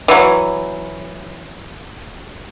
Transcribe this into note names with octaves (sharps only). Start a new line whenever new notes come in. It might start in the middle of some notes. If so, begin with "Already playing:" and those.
E3 F#3